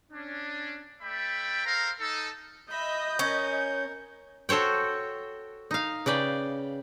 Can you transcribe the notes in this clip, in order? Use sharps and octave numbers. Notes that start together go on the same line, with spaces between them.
C#4 D4
A3 D5 E5 G5 B5
A4 A#4 C5 F5 A#5
D#4 A4
D#5 E5 B5 G6
C#4 A#4
F#4 A4 C5 C#5 G5
D#4 F5
C#3 B4 D5 G5